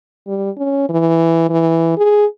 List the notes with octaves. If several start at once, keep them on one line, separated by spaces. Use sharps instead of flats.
G3
C#4
E3
E3
G#4